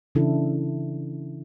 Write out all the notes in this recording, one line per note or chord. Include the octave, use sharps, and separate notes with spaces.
C#3 E3 D4 E4 A4